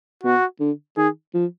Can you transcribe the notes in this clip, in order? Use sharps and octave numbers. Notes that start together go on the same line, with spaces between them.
B2 F#4
D3
D#3 G#4
F3